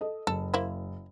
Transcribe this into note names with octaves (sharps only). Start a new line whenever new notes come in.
A4 D#5
F#1 A4
A#3 E4 C5